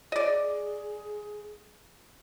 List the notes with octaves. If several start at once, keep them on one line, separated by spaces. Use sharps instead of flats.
G#4 D5 D#5